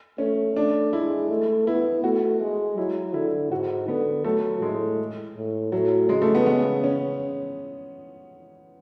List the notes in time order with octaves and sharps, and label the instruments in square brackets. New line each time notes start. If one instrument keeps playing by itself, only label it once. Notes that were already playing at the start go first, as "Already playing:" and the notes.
[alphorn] A3 [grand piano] C#4
[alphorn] A3 [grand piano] D4
[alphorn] G#3 [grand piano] E4
[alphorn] A3
[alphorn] B3 [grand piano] E4
[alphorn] A3 [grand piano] F#4
[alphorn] G#3
[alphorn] F#3 [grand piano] E4
[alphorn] D3 [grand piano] E4
[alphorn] G#2 [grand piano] F#4
[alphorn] D3 [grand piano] B3
[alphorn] F#3 [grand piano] A3
[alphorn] A2 [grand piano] G#3
[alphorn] A2
[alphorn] A2 [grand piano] F#3
[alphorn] C#3 [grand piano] G#3
[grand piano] A3
B3
B3
C#4